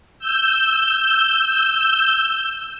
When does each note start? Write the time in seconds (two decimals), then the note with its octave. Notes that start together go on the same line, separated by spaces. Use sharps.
0.19 E6 G6